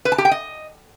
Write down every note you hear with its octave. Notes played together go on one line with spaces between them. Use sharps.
B4
A5
G4
G5
D#5